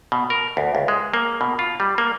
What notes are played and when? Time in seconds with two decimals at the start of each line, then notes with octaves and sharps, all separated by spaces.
0.12 B2
0.30 A#4
0.57 D2
0.75 C#2
0.88 G#3
1.14 A#3
1.41 B2
1.59 F4
1.80 G3
1.98 A#3